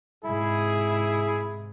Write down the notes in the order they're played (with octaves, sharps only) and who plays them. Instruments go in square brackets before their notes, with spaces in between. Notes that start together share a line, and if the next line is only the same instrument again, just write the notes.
[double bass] G#2 C3 [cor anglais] E4 [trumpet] G#4